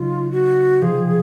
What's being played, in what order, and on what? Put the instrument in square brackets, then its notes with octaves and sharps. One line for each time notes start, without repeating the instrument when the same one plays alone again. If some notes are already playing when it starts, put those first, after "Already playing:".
Already playing: [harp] C#3 F#3 D#4 [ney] F4
[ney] F#4
[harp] C3 F3 C4 F4 [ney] G#4